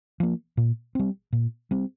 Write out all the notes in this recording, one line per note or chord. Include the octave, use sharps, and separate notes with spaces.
F3 A#3
A#2
G3 C4
A#2
G3 C4